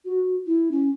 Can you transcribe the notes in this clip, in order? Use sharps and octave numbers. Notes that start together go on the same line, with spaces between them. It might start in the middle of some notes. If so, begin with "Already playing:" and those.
F#4
E4
C#4